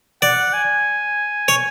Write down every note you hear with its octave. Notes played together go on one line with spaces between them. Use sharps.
D5 F#5
G#5
C#5